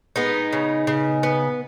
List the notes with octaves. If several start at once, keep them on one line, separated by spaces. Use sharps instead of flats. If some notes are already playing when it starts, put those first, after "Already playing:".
G#3 B3 D#4
C#3
C#3
B3